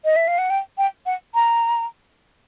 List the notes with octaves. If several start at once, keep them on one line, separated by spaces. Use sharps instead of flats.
D#5
E5
F5
F#5
G5
G5
F#5
A#5